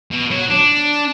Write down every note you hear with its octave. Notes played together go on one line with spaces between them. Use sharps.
B2
F#3
D4